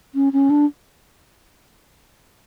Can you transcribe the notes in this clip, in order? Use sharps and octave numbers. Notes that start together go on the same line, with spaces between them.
C#4
C#4
D4